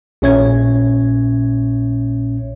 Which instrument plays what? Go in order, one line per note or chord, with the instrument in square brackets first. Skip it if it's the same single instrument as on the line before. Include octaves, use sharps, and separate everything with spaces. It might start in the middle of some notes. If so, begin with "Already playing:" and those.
[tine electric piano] A#1 A#2 C#4 C#5 E5 G#6